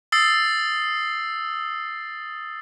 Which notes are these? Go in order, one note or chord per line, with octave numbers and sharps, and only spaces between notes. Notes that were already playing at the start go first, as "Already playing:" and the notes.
D#6 E6 A6 C7